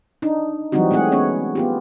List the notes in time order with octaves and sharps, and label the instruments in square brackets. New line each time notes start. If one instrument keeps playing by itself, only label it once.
[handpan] D4 D#4
E3 F#3 G3 C4 D#4 F#4
G#3 A3 C4 G#4 F#5
B3 C#4 C#5
B3 F4 G4